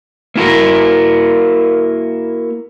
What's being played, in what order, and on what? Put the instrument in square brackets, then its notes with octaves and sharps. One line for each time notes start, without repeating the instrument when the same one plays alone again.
[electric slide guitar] A#3 E4 F#4 A#4